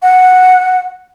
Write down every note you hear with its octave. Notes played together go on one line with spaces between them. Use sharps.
F#5